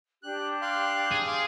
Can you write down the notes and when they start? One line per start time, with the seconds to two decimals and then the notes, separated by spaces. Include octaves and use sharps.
0.23 D4 G4 F#6
0.62 F5 C6 F#6
1.11 G#4
1.27 F5 C6 D6